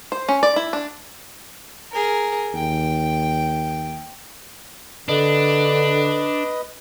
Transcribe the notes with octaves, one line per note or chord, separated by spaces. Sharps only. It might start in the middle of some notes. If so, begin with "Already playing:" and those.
C5
C#4
D5
E4
D4
G#4 A#4
D#2 G5
D3 D4 B4 D#5